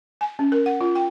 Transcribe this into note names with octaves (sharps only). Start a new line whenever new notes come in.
G#5
C#4
A#4
F#5
F4
G5